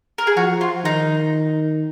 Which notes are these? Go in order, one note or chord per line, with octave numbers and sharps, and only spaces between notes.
A#4
G#4
F3 F#4
F4
D#3 D#4